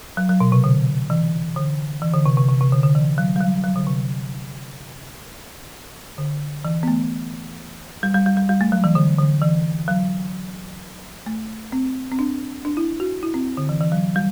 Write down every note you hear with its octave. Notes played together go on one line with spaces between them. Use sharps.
F#3
F#3
B2
C3
D3
E3
D3
E3
D3
C3
C3
C3
C3
D3
D3
E3
F#3
G3
F#3
F#3
D3
C3
D3
E3
B3
A3
G3
G3
G3
G3
G3
A3
F#3
E3
D3
D3
E3
F#3
A3
C4
C4
D4
D4
E4
F#4
E4
C4
D3
E3
E3
F#3
G3